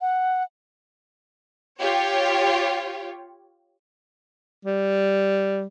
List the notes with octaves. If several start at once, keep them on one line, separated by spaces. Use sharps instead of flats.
F#5
F4 G4 C#5
G3